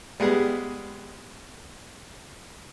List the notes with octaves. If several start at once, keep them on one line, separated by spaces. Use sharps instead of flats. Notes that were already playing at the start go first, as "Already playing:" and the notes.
G3 G#3 B3 G#4